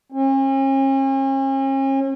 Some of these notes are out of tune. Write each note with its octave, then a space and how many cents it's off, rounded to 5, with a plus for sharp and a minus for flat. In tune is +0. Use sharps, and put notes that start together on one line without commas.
C#4 -45